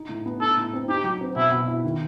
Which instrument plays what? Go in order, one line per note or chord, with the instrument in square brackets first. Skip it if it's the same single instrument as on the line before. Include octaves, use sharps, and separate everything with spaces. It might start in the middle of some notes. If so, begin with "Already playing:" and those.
Already playing: [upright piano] D#4
A2
B3
[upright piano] D#4 [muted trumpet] A4
[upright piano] A2
C4
[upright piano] D#4 [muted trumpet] G4
[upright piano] F#3
C4
[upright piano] B2 [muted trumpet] E4
[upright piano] B2
E4
D#3